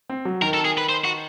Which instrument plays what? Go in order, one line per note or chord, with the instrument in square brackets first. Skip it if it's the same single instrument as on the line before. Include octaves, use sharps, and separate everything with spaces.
[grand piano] C4
F#3
[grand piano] D#3 [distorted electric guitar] A#4
[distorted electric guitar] A4
G#4
B4
C5
F#4